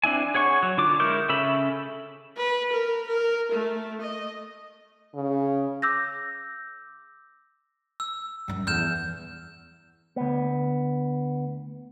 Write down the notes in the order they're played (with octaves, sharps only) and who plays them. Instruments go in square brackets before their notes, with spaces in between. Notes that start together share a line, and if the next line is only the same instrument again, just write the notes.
[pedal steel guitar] C4 D4 E4 G#5
G#4 C#5 F#5 C#6
F#3
D3 F4 D6
G#3 E4 A#4 C#6 G6
C#3 C#4 A4 E5 B5
[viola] B4
A#4
A#4
A3
D#5
[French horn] C#3
[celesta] D6 E6 G6 A#6
[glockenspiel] E6
[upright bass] F#2 G3
[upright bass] E2 [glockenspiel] F6 G6 E7
[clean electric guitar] D2 B3